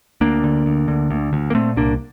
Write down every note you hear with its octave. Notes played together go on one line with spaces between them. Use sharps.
D2 A#3 D4
D3
D2
D3
D2
D2
A#3
A#2 A3 C4
C2 A#3 D4